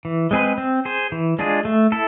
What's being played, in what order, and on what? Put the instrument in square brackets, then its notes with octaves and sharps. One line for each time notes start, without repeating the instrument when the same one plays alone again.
[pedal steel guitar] E3
G#3 C4 G#4 B4
C4
G#4 C5
E3
G#3 D4 F4 G#4
A3
E4 A4